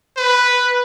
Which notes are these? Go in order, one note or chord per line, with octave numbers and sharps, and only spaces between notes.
B4